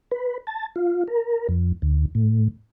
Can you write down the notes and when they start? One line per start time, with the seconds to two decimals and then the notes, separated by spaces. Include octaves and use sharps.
0.11 B4
0.47 A5
0.76 F4
1.08 A#4
1.49 F2
1.82 D2
2.15 A2